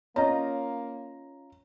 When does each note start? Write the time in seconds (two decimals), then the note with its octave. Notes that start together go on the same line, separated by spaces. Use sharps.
0.16 A#3 C#4 F4 C#5 D#5 A#5